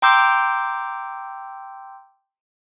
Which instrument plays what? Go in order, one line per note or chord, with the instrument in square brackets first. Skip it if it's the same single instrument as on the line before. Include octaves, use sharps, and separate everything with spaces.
[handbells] G5 A#5 C6 D6 E6 G6